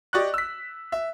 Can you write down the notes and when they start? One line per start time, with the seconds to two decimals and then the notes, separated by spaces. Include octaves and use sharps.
0.13 G4 D5 D#5 C#6 F#6
0.34 E6 B6
0.92 E5